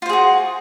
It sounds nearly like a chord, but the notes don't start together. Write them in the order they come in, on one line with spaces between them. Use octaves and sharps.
F4 C5 G#4 F#4